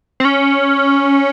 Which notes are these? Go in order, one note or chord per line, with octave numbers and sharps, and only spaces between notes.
C4
C#4